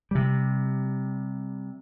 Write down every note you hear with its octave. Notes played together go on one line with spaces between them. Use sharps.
C3 G3